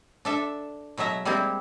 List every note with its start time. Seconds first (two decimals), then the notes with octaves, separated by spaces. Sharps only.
0.25 D4 A4 E5
0.97 B2 F#3 G#3 E5 A#5
1.25 G3 G#3 A#3 C4 E4